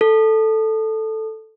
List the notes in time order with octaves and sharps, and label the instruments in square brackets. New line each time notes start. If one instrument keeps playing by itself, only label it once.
[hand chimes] A4